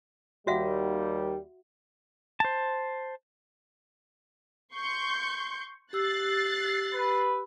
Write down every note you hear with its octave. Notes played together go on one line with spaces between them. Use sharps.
D#2 G3 F#4 E5 F#5
C5 A5
C6 C#6 G6
G4 E6 F#6 A6 C7
B4